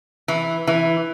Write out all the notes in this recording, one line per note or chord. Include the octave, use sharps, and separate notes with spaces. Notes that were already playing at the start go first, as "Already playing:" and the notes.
E3
E3